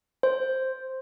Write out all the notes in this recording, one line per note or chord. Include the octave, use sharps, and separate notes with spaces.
C5